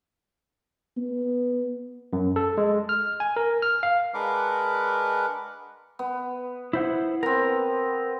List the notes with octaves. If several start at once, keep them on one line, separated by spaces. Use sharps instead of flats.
B3
F#2
A4
G#3
F6
G#5
A#4
F6
F5
G#3 D4 A#4 B4 F#5 D6
B3
E4 C5 F#5
B3 C4 A#4